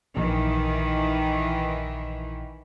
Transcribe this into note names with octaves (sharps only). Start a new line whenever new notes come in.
A#1 D#3 E3